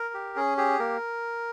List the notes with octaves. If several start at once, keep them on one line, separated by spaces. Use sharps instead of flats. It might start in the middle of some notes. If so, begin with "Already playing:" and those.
Already playing: A#4
G4
C#4 G#4
G4 G#4
A#3 A#4